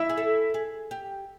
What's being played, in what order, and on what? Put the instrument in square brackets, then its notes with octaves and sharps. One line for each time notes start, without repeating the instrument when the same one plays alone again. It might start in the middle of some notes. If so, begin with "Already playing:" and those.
Already playing: [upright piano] E4 E5
[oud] G#4
A4
G#4
G4